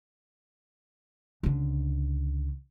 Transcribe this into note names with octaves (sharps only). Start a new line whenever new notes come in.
C#2 D3